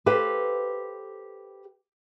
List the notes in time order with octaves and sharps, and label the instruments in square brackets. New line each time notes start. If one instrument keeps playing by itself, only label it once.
[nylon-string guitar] G4 A4 B4 C5 F5 G5